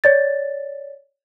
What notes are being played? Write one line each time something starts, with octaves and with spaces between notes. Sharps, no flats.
C#5 D5 A6